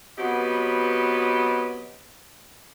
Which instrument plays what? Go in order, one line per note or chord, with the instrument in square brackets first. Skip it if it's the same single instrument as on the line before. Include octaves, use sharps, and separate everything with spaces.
[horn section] F#3 B3 C4 G4 B4 D#5